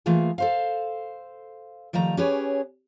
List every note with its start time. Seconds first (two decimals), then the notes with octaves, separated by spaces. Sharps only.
0.06 E3 A3 A#3 F4 G#4
0.38 A4 C5 F5
1.93 D#3 F3 G3 A3 A#5
2.17 C#4 G4 G#4 B4 C#5